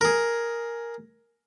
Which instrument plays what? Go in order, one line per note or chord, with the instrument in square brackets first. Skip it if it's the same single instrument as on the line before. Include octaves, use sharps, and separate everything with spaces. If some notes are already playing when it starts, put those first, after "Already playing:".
[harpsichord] G#4 A#4